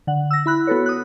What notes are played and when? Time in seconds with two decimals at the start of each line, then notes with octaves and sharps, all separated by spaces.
0.07 D3 F#5
0.31 E6 A#6
0.46 E4 B5 F#6
0.67 B3 F#4 A4 B4 C#5
0.86 D#6 F#6